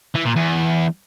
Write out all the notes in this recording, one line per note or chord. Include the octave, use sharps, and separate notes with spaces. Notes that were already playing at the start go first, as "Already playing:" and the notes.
E3
A#2
E2